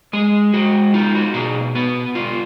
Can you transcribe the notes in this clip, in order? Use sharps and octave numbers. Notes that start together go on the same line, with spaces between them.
G#3 G#4
G#3 F#4
D#4 F4
F#4
B2 G#4
B3 B4
F4